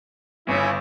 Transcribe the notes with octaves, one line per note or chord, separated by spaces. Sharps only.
G1 C#3 E4